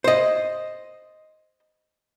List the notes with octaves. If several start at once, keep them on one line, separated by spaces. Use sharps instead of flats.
C5 D#5